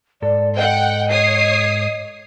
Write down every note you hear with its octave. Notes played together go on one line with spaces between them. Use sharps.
G#2 A4 D5
D#5 F#5 G5
C#5 D#6 C7